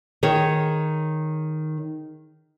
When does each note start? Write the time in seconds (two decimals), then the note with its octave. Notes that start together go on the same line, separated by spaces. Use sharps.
0.23 D#3 G#4 C#5